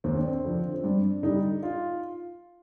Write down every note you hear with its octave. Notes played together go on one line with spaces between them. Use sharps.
D#2 C4
D4
C4
D3 F3
C4
G2 D4
D3 G3 D#4
F4